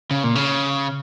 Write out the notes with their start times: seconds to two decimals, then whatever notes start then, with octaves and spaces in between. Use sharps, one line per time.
0.11 C#3
0.24 A#2
0.35 C#3